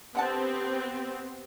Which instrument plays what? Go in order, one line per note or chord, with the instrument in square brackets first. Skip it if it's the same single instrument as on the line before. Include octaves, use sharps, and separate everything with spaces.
[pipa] D3 F#5 A5 [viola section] B3 C4 G4